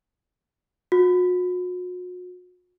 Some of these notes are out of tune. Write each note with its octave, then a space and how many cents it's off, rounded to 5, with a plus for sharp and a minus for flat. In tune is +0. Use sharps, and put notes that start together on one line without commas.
F#4 -40